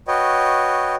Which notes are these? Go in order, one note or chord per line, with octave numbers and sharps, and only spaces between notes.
F#4 B4 C#5 D#5 G5